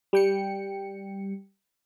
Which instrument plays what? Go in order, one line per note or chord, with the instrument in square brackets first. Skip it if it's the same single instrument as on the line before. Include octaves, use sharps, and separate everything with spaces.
[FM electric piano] G3 G5 C#7